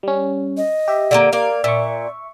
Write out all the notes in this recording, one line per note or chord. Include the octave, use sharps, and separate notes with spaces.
G3 C#4
D#5
G4 E5
D3 G#3 A#3
A#3 D5 F5
A#2 E5 C#6